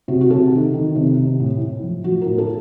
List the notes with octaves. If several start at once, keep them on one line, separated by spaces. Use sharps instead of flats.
C3 F#4
F#4
C3 A4
D#3
D#3
C3
C3
A2
A2
F3
F3 F#4
A#4
A2
A4